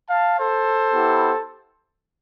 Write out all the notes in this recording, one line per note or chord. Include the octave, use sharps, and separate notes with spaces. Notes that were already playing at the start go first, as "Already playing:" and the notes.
F5 A5
A4 C5
B3 E4 G4